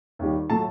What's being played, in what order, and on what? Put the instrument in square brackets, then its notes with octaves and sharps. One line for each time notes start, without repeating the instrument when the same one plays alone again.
[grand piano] D#2 D#3 G3
A2 F#3 A3 A5